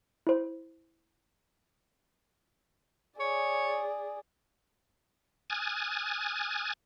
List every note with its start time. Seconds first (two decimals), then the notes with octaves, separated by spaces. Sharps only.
0.27 E4 C5
3.20 G#4 C#5 D5
5.50 G#5 D#6 F6 F#6 G#6 A6